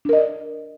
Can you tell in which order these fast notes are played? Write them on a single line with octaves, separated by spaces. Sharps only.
D4 A#4 D#5 D5